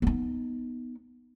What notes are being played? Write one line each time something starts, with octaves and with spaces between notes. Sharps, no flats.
B3 D#4